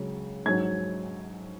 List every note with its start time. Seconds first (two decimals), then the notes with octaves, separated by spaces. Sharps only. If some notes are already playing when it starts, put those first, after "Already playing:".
Already playing: C#2 C#3 F#3
0.45 G#2 F#3 G#6